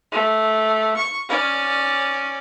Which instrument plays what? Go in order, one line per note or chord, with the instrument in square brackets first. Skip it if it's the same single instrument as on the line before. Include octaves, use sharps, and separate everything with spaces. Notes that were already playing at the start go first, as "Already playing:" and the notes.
[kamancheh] A3
C#6
C#4 D5